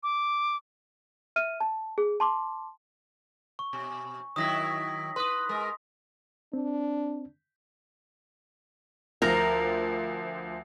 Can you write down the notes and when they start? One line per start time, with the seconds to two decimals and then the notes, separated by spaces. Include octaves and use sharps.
0.03 D6
1.36 E5 F6 D#7
1.60 A5
1.98 G#4
2.20 A5 C6 D6
3.59 C#6
3.73 B2
4.36 D#3 F#3 E4 D#6 A#6 B6
5.16 B4 C6 D#6
5.49 G#3 A#4
6.53 C4 D4
9.22 D2 F3 A#4 A#6